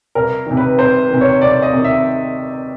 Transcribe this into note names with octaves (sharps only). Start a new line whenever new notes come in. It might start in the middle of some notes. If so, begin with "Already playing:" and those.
C2 A#4
C3 D#3
B4
C2 C5
C3 D#3
C#5
C2 D5
D#5
C3 D#3
E5